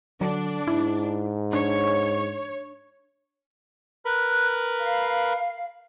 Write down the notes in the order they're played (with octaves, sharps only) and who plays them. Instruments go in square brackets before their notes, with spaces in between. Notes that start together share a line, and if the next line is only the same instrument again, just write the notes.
[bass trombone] D3 [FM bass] F#3 [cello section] D4
[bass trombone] G#2 [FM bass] E4
[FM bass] D4 [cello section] C#5
[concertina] A#4 B4 B5 [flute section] F#6
[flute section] F5